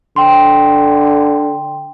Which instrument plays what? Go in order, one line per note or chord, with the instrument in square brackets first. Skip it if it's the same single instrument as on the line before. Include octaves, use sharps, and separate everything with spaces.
[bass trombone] D3 [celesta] G5 C6